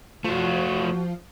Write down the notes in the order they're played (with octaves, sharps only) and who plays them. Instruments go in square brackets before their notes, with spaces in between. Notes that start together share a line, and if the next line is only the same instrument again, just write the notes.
[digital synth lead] F3 [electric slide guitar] A3 F4 [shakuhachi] F#4